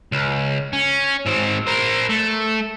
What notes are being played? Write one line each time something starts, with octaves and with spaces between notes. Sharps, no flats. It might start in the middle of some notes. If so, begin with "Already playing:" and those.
C#2
C#4
G#2 C4
A#4 C5
A3